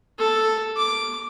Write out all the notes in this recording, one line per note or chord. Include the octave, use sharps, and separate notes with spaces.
A4
D6